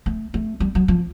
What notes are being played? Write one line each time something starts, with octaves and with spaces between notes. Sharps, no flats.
A3
A3
G3
F#3
F3